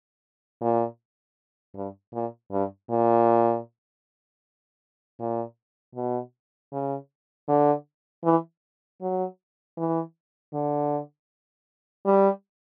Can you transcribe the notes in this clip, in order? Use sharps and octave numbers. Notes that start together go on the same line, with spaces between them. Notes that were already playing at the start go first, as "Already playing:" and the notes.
A#2
G2
A#2
G2
A#2
A#2
B2
C#3
D3
E3
F#3
E3
D3
G3